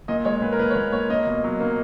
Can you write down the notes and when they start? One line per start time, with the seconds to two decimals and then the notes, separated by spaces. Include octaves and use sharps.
0.08 A#2 D#5
0.25 G#3 C#5
0.42 A#2 B4
0.53 A#4
0.59 A#2 B4
0.70 C#5
0.75 A#2 B4
0.92 A#2 C#5
1.10 A#3 D#5
1.27 B2
1.44 F#3
1.60 A#3